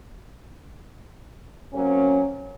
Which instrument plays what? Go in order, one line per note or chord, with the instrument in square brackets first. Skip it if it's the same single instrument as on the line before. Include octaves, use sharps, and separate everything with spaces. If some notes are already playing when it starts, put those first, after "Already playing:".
[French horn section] F#3 A#3 C4 C#4